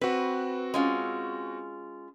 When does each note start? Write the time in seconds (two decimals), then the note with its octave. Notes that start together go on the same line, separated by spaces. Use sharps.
0.01 C4 F#4 B4
0.74 G#3 C#4 F4